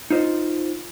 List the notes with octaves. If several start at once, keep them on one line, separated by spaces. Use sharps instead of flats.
D#4 F4 C5 D#5